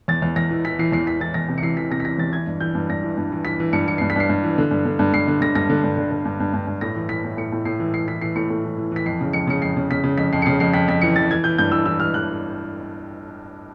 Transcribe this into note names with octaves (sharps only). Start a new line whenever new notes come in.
E2 A6
E2
E2 A#6
E3
E3 B6
E3 C7
E2 C7
E3 B6
E3 A6
E2 A#6
C3
C#7
E3 C7
E3 B6
C3 A#6
B6
E3 A#6
E2 A6
E3 G#6
G2
E3 G6
G2
G2 A#6
E3
G2
E3
E3 B6
E3
G2 C#7
E3 C#7
G2 C7
B6
G2 C7
G2
E3
D3
G2
D3
G2
G2 C7
D3
D3 A#6
G2 A#6
D3
G2
D3
D3
G2
G2
G2
G2
A2 A#6
E3
E3 B6
A2
A2 C#7
A2
A2 C7
E3
E3 C7
E3 B6
E3 C7
A2 C#7
A2
E3
E3
E3 B6
F2 C7
C#3
F2 C#7
C#3 C#7
F2 C7
C#3
C#3 B6
C#3
F2 B6
F2 C7
C#7
C#3 C7
F2 C7
F2 B6
F2 B6
E3 C#7
E3 A6
E3 G#6
E3 G6
G2 G6
E3 E6
E3 E6
E3 F6
E3 F#6